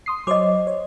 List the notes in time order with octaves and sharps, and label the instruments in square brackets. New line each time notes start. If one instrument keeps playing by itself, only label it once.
[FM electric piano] C6 D#6 C7
[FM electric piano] F#3 C5 C#5 [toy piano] D#5 D6
[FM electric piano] C#5